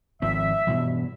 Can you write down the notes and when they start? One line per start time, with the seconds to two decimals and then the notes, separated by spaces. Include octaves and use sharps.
0.22 G#1 F3 C4 E5
0.67 G2 B2 E3